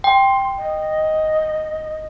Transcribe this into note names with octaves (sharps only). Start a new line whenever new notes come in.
G5 C6
D#5